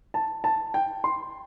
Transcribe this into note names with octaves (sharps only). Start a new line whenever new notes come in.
A5
A5
G5
C6